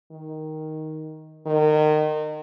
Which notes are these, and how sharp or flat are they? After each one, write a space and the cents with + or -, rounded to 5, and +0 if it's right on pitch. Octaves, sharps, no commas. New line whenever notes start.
D#3 +5
D#3 -30